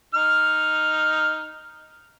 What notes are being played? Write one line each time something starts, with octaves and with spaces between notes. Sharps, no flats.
D#4 F6